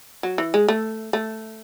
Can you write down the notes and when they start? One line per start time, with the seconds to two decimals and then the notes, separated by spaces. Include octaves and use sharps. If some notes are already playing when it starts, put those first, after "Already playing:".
0.23 F#3
0.38 E3
0.54 G#3
0.68 A3
1.13 A3